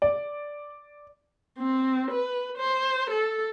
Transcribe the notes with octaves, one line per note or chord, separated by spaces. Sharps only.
D5
C4
B4
C5
A4